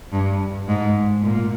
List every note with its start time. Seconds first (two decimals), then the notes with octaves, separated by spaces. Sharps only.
0.12 G2
0.67 G#2
1.23 A#2